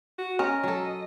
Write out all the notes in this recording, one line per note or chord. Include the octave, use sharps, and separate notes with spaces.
F#4
C#4 A#4 D#5
F#3 A4